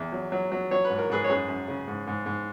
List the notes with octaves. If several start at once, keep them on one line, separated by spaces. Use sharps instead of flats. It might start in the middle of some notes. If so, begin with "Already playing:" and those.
Already playing: E2
F#3
F#3
F#3
F#3 C#5
B4
G#2
A#4
G#2 G#4 B4
C#5
F#2 G#4 B4
F#2
C#3
G#2
G#2
G#2